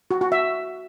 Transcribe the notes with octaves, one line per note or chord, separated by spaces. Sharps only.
F#4
F#4
E5